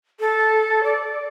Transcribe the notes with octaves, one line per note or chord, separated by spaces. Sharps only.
A4
D5